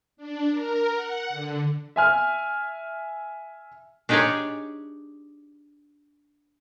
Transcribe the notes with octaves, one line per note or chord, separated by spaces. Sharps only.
D4
A#4
F#5
D3
E5 G#5 F6
D4 D#4 G4 G#4 C#5 D5